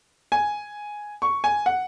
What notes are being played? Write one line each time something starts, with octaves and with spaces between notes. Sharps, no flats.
G#5
C#6
G#5
F#5